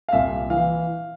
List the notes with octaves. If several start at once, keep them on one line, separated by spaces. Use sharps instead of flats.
F5
C2 A#2 E5
E3 F5